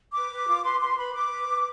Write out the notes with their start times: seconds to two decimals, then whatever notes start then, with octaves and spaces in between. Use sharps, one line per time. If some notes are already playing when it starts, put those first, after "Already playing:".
0.14 B4 D6
0.31 B4
0.47 F4
0.64 B4 C6
0.80 B4 C6
0.97 B4 B5
1.14 B4 D6
1.31 B4
1.48 B4